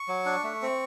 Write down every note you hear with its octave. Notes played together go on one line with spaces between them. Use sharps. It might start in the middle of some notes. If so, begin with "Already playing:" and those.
Already playing: C#6
F#3
D4
A3
C4